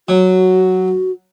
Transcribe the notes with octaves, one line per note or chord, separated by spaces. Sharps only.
F#3 F#4